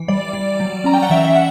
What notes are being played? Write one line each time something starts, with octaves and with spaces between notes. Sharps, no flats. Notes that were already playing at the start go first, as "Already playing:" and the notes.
Already playing: E3
G3 D5
G3
F#3
C#4 A#5
G5
F#5
E3 E5
E5
F#5